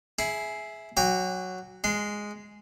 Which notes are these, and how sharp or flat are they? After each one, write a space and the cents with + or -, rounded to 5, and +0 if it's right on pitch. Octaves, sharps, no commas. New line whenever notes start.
E4 -5 G#4 +15
F#3 +0 G5 +40 D6 +0
G#3 +0 C6 -25